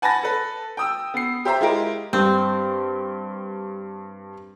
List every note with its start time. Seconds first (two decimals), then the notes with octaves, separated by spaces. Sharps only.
0.02 F#5 G#5 A5 B5 A6 A#6
0.23 A4 B4
0.77 G5 D#6 E6
1.14 B3 C7
1.45 G4 C5 E5 A#5
1.60 G#3 E4 F4 G4 A#4 D#5
2.13 G2 C4